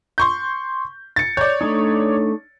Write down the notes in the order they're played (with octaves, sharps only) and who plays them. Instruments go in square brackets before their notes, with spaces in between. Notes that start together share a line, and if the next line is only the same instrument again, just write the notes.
[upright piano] C6 C#6 G6
A6 C#7
[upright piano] C#5 D5 [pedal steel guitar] G6
[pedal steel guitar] A3 D4 D#4